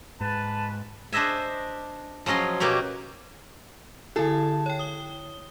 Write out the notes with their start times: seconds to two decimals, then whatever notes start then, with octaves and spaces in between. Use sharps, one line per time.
0.21 G#2 B4 A5
1.13 D4 C5 D#5 E5 G#5
2.26 F3 F#3 C#4 D#5 C6
2.60 B2 A#3 G4 C#5
4.16 D3 E4 G#4 A4
4.66 C#5 G5
4.79 D#6 G7